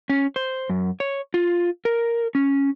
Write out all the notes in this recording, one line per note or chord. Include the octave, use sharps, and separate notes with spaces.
C#4
C5
F#2
C#5
F4
A#4
C#4